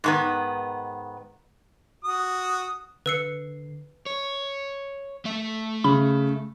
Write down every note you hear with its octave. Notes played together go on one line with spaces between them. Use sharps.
G#2 D#3 B3
F#4 D#6
D3 B4 E6 C7 C#7
C#5
A3 E5
C#3 B5